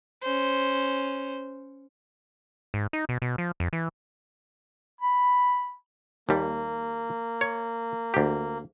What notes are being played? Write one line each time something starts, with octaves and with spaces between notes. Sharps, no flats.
C#4 C5
G#2
D#4
B2
B2
F3
F2
E3
B5
D#2 G3 A#3
C#5
D2 G4